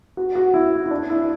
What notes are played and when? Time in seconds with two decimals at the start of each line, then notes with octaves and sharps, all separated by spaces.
0.17 F#4
0.35 F#4
0.54 E4
0.86 E4
0.91 D4
1.10 E4